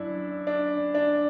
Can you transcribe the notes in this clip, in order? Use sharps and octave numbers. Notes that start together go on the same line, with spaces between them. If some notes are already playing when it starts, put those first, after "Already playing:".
Already playing: F#2 D4 E4
D4
D4